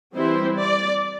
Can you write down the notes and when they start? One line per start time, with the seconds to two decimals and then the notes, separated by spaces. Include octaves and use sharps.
0.15 E3 G3 C4 E4 C5
0.57 D5